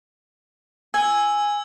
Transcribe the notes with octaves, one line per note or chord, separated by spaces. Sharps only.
G#5 E6 G#6